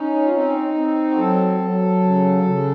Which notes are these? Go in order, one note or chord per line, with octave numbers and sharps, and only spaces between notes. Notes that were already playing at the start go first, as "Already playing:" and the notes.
Already playing: C#4 D#4
F4
C4 D#4
C4
F#4
F#3 A4
F#3
C#3
C#3